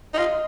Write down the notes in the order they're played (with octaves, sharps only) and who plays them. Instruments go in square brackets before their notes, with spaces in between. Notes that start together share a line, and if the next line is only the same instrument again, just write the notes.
[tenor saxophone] D#4
[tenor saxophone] F4 [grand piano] D#5